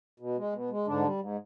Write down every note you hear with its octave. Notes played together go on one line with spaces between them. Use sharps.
B2
G#3
B2
G#3
G#2 D3 D4
G3
G#2